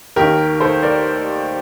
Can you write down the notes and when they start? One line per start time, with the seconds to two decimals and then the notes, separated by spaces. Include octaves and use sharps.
0.16 D#2 D#3 G4 A#4
0.60 A4 C5
0.83 A#4 D5